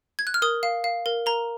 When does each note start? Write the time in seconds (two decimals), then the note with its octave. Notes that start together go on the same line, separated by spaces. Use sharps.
0.19 G#6
0.27 F#6
0.34 F6
0.42 A#4 D#6
0.63 F5
0.84 F5
1.06 A#4
1.26 A#4 A#5